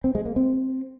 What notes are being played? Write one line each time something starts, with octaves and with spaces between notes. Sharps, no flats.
C4
G#3
A#3
C4